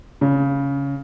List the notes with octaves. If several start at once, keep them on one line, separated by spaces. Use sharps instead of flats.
C#3